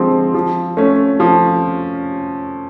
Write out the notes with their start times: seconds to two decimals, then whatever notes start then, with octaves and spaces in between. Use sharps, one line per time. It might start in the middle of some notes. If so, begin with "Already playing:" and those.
Already playing: D3 F3 G#3 C4
0.34 F3
0.77 A3 C#4
1.20 F3